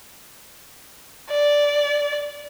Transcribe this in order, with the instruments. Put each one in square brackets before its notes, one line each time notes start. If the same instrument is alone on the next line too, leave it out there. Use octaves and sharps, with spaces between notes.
[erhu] D5